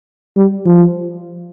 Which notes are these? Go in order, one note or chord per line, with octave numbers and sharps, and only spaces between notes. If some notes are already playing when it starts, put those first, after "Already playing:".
G3
F3